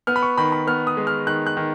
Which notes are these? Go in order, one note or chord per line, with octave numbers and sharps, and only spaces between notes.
B3 F6
B5
C#6
D#3 B5
B5
B3 F6
D#6
G#3
F6
D#3 F#6
F#6
D#3